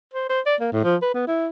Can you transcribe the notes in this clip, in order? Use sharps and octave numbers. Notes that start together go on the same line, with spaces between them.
C5
C5
D5
A#3
A2
F3
B4
B3
E4